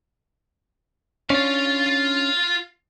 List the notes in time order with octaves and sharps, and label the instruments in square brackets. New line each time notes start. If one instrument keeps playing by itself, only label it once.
[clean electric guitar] C#4 D4 [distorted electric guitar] F4 F5